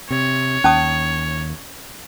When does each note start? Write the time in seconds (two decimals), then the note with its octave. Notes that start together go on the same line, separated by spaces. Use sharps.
0.11 C3 C#5
0.64 D#2 C#4 A5 D#6